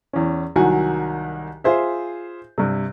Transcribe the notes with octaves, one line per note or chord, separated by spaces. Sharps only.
E2 C#4
C2 D#3 F#3 F#4 G#5
F4 G#4 C5 E5
G2 C3